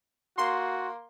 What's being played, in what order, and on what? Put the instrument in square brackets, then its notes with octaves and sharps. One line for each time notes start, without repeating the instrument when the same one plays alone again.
[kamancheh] A#3 [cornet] F#4 [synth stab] C6